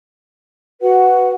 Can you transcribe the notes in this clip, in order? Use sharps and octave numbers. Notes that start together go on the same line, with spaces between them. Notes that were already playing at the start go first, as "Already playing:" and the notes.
F#4 B4 F#5